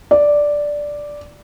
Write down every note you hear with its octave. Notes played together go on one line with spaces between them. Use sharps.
D5